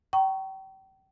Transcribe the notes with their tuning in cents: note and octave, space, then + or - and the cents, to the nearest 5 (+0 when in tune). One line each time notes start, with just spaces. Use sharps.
G5 -35 A#5 +0 C#6 +0